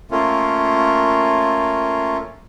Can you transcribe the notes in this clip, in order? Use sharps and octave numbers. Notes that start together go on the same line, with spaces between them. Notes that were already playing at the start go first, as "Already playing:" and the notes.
A3 A#3 C#4 F4